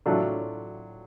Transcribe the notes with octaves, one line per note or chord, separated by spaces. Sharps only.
A2 F#3 A3 D4 F4